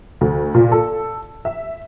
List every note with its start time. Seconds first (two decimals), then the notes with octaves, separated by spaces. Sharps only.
0.21 D2
0.54 A#2
0.72 A4
1.45 E5